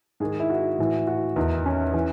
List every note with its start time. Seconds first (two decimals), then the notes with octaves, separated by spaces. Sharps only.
0.20 G#2 D#3 G#4
0.40 E4
0.50 F#4
0.79 A2 E3
1.07 F#4
1.36 E2 D#3 D#4
1.66 C#4
1.94 E3